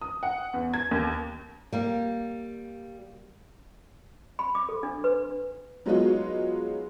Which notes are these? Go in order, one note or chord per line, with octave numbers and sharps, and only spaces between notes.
D#6
F#5
E2
G#6
D#2
G3 A#3
B5
D6
A4
D4
B4
F#3 G#3 B3 D#4 F4 F#4